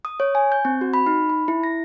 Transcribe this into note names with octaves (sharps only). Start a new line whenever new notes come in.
D#6
C#5
G#5
G6
C4
F#4
B5
D#4
B5
E4
A#6